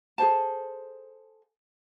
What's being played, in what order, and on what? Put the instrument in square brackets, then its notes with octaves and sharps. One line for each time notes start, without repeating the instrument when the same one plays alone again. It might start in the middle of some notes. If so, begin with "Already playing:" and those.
[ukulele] G#4 A4 C5 A5